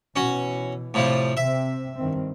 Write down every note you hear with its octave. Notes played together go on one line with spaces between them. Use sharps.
B2 E3 C#4 F#4
A2 C3 F3 G3
C3 C4 E5
G2 D#3 C4